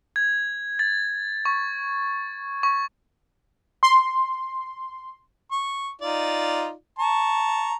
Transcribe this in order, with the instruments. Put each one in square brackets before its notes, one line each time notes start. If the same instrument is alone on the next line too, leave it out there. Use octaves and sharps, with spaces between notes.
[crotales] G#6
A6
C#6
C#6
[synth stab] C6
[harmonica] C#6
D#4 F4 D5
A5 A#5 C#6